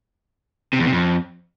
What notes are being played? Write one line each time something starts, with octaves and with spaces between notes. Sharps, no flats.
C3
E2
C3
F2